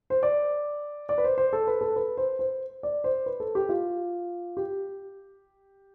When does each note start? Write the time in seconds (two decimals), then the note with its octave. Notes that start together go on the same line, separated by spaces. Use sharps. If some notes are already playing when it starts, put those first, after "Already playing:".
0.10 C5
0.23 D5
1.09 D5
1.18 B4
1.24 C5
1.38 C5
1.53 A4
1.67 B4
1.81 A4
1.96 B4
2.17 C5
2.39 C5
2.83 D5
3.04 C5
3.26 B4
3.40 A4
3.55 G4
3.69 F4
4.57 G4